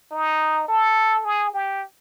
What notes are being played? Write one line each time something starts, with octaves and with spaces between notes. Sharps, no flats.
D#4
A4
G#4
G4